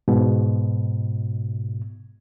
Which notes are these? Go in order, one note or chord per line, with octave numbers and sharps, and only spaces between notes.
G#2 B2